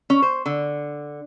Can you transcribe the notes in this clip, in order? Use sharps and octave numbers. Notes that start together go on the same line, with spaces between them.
C#4
C5
D3